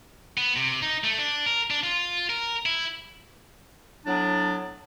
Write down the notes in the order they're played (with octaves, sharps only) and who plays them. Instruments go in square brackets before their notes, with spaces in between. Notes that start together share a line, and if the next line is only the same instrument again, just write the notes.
[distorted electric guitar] B3
C3
D#4
A3
D4
A#4
D4
F4
A#4
E4
[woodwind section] A2 F#3 B3 D4